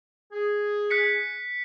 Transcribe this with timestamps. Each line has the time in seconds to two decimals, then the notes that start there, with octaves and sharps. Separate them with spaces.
0.33 G#4
0.90 F#6 B6 C#7